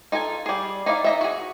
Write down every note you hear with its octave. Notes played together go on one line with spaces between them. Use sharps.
D#4 F4 A4 G#5
G3 G#4
D#4 E4 D5 F5
D#4 D#5 E5
F#4 G#4